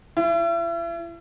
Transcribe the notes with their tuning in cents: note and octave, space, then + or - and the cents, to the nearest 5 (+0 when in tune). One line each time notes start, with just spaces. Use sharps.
E4 +40